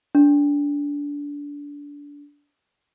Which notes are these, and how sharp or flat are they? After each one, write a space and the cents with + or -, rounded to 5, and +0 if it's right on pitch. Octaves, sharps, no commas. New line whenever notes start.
D4 -25